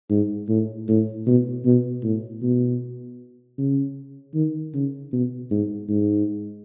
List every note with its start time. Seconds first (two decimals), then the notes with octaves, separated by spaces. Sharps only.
0.10 G#2
0.49 A2
0.88 A2
1.26 B2
1.65 B2
2.03 A2
2.42 B2
3.58 C#3
4.34 D#3
4.74 C#3
5.12 B2
5.51 G#2
5.89 G#2